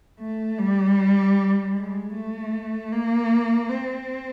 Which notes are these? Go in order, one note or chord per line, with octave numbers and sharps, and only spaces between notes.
A3
G3
G#3
A3
A#3
C4